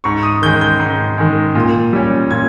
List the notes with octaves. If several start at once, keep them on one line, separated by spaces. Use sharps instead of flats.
G#2 C#6
D#6
D#3 G#3 G6
G6
G#2
D#3 G#3
A#2
G3 C#4
A#2 G#6